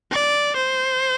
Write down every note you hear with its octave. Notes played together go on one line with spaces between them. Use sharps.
D5
C5